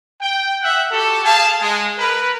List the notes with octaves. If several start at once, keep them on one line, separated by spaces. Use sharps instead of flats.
G5
E5 F#5
F#4 G4 A4
G#4 F5 A5
G#3
A#4 B4